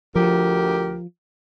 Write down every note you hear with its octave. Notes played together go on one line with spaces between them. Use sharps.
D2 F3 G4 A#4